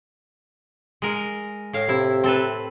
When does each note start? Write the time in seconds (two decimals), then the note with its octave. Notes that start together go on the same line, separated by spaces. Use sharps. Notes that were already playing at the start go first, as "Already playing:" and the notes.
1.02 G#3 A#4
1.73 A2 F5
1.89 C3 E4
2.24 C4 A4 B4